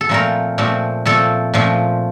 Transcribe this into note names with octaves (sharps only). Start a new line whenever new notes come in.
A4
A#2 F3 A3 C4 A#4
A#2 F3 A3 C4
A#2 F3 A3 C4 A4
A#2 F3 A3 C4